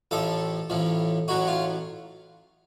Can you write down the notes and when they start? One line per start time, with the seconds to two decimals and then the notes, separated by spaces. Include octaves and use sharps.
0.11 A1 A2 F3 A4
0.70 A1 A2 F3
1.28 A1 A2 F#3 F#4
1.48 F4